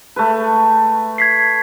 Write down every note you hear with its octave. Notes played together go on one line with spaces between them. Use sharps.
A3 B4
G#6 B6 C7